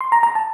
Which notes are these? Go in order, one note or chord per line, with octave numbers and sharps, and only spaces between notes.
C6
A#5
A#5
A5